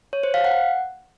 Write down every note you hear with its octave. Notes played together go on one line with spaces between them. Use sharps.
C#5
C5
F5
F#5